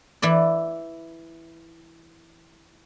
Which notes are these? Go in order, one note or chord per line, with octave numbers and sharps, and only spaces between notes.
E3 E4 D5